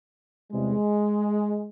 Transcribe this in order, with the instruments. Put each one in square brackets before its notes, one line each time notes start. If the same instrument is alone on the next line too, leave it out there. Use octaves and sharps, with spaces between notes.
[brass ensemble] E2 C3 E3 G3 G#3